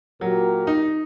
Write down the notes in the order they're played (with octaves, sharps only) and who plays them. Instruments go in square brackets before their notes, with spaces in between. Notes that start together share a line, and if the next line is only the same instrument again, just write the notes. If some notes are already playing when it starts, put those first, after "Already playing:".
[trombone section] A#2 G4 A#4 [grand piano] F#3
[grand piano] D#4